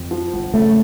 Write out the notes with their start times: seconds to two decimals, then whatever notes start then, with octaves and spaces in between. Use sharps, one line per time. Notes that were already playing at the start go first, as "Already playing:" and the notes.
Already playing: F2
0.11 F3
0.33 G1
0.54 C#3 A3